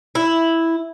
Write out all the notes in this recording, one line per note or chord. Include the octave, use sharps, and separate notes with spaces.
E4